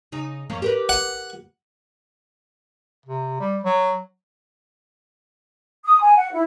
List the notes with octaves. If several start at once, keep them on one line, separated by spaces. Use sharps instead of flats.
C#3 D#4
F2 A#3 C#4
G4 A#4 B4
F#5
C3
G3
F#3
D#6
G#5
F#5
E4